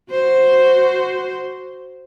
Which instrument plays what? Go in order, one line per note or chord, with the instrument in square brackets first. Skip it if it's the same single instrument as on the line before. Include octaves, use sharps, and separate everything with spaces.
[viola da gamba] F#4 C5